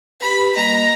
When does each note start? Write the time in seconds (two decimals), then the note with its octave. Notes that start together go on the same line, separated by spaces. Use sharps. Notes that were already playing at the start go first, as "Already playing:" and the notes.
0.21 G4 B4 B5
0.56 G3 A#3 D#5 A#5